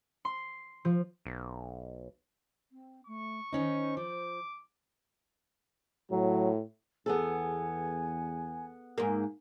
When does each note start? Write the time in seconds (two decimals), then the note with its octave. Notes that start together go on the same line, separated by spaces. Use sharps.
0.25 C6
0.85 F3
1.26 B1
2.72 C4
3.07 A3 C#6
3.53 D#3 C#4 D#4 C5
3.97 F3 D6
6.11 A2 F#3
7.06 E2 B3 G#4 A4 G#5
8.98 G#2 A#3